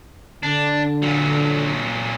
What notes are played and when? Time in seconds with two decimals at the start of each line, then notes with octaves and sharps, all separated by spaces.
0.43 D3 D4
1.02 A#2 F#3